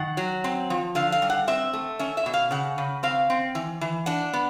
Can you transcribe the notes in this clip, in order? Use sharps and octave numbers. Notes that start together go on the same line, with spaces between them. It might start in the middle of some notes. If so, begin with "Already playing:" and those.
Already playing: D#3 F#5
F#3
C4
F3
D3 F5
F5
G3
F#5
C4 E5
A3
C#4 E5
E5
B2
F5
C#3 F#5
C#3
C4 F5
C4
E3
E3
D4 F#5
B3